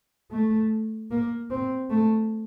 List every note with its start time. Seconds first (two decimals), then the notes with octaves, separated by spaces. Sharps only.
0.31 A3
1.11 A#3
1.50 C4
1.90 A3